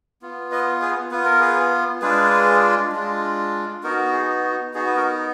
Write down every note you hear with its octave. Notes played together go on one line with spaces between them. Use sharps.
B3 F4
B4 D#5
G#4 B4
B3 F4 B4
A#4
G#4 B4
G#3 D4 F4 G#4 B4
G#3 D4 F4
B3 D#4 F#4 A#4
G#4
F#4
B3 D#4 F#4 G#4
B4
F#4 A#4